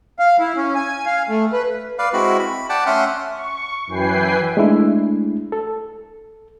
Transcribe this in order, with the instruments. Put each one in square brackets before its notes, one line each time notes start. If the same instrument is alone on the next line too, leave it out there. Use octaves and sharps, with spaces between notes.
[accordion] F5
E4
C#4
G#5
F5
A3
B4
[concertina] B4 D5 F5
G#3 C4 E4 F#4 B5
B5
D5 F#5 G5 A5
A3 C#4 E5 F#5 C6 F6
[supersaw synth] C#6
F#2 E3 B4 G5 G#5 C7
[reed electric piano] G#3 A3 D4 E4
A4